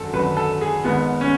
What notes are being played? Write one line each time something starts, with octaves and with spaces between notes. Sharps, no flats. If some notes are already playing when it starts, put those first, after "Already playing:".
Already playing: G#1 F#2 D3 A4
G#1 F#2 D3 B4
A4
G#4
G#1 G#2 G#3 B3
C#4